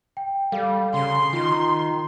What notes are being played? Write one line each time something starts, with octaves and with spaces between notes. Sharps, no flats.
G5
G3 A4 F5
C#3 C6
D#3 F4